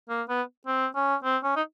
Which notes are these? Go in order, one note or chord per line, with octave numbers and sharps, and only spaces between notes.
A#3
B3
C4
C#4
C4
C#4
D#4